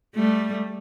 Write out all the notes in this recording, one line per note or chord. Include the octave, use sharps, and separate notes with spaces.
G3 A3